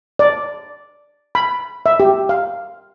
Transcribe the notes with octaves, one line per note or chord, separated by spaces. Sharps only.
D5
B5
E5
G4
F5